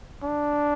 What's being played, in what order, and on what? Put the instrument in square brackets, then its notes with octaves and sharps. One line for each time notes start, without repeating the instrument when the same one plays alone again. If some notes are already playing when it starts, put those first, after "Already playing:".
[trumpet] D4